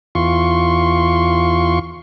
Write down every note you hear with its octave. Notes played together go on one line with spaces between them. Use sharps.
E2 F4 C6 C#6